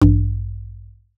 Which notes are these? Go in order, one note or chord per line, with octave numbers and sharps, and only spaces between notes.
A1 G2